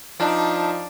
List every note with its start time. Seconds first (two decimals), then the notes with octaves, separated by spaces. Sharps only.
0.20 F3 D4 D#4